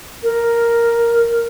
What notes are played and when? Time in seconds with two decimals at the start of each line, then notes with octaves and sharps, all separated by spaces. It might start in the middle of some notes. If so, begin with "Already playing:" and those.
0.23 A#4